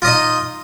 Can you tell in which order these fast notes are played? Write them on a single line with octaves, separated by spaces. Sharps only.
F4 D#5 D#4